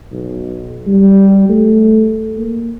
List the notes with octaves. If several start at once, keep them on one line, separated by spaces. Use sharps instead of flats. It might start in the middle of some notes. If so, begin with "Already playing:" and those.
B1
G3
A3
A#3